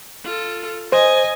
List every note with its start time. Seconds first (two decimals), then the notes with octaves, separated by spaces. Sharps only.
0.25 F4 A4
0.92 C5 D#5 G#5